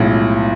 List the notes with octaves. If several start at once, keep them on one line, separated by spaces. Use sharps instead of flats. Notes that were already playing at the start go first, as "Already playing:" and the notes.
Already playing: B1 A2 F3 G#3